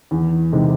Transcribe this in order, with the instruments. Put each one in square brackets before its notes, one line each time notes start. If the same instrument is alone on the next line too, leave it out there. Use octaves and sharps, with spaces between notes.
[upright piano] E2
C3 D#3 G#3